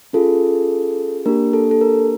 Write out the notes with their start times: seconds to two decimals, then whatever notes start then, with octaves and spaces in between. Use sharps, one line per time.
0.13 C#4 F4 G#4 A4
1.26 A#3 D4 G4 A#4
1.53 A4
1.71 A4
1.81 A#4